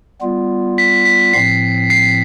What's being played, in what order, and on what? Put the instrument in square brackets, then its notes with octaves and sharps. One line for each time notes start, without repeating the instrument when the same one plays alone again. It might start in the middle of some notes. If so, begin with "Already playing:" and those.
[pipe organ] G3 B3 F4
[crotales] B6
B6
[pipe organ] A2 F3 C4 [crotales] C7
[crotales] C7